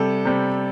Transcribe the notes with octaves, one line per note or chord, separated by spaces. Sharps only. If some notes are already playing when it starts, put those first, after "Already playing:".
Already playing: C3 G3 A4
C3 G3